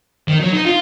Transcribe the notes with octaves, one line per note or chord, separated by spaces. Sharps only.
D#3
F#3
D#4
F4